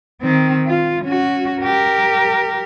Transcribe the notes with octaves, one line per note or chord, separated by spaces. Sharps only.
D#3 C4
F4
C#4 F#4
G4 A#4